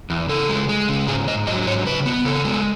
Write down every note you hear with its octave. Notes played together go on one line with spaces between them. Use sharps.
E2
C#3 A4
G#3
G#3
C#3
G#2 G#4
G#2 D#5
F#3 D#5
G#2 C#5
C#3 B4
B3
C#3 A4
G#3